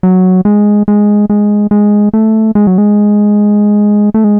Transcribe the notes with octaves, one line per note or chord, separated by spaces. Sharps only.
F#3
G#3
G#3
G#3
G#3
A3
G#3
F#3
G#3
A3
G#3